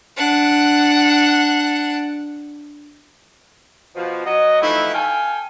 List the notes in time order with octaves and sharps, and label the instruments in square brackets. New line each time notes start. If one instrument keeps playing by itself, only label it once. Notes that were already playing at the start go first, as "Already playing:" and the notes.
[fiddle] D4 F#5
[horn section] B2 F3
F#3 D#5
E3 F3 A3 D#4 E4
A4 F5 G5 G#5